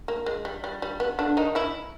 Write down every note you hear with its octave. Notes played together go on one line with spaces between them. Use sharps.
A#3
G#3
G3
G3
G3
B3
D3 D4
D#3 D#4
E3 E4